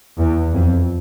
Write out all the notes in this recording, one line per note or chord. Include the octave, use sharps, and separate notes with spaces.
E2
F2